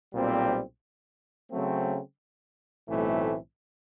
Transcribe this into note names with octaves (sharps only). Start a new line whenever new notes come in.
B1 A#2 G3 C4
C#3 F#3 A3 C4
B1 A2 E3 A3 C4